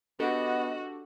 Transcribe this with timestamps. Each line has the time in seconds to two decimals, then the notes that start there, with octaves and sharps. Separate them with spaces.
0.20 B3 D4 F#4 G4 A4 D#5